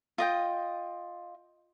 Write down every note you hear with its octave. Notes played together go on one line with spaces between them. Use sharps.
F4 D#5 G5